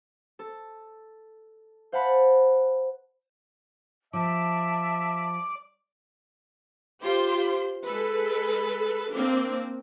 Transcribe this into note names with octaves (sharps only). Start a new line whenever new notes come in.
A4
C5 F5 F#5 A5 B5
F3 D5 E5 A5
F4 G4 C5 C6
G#3 A4 B4
A#3 C4 D4